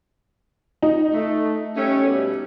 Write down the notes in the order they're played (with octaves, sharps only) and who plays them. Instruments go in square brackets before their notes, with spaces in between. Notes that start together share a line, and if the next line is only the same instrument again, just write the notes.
[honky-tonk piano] D#4
[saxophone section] A3
G3 A3 C#4
B2 G3